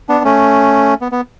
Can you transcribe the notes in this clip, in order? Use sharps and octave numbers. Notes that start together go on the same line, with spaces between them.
B3 D4
A3 C#4
B3
B3